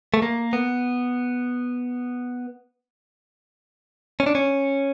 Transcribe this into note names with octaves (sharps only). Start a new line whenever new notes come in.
A3
A#3
B3
C#4
D4
C#4